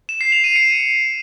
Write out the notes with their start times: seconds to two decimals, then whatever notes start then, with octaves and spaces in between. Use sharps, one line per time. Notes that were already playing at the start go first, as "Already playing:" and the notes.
0.09 E7
0.21 C7
0.32 F7
0.44 D#7
0.56 C#7